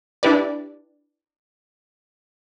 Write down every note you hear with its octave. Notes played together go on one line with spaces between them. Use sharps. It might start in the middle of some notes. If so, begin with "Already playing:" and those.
D4 E4 G4 B4 D5